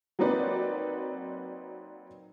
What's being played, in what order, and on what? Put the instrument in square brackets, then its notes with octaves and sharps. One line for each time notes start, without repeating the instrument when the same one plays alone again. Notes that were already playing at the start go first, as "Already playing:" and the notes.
[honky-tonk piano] F#3 A#3 C4 D#4 B4 D5